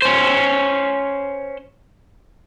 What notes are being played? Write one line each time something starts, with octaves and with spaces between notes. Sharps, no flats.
C#4 C5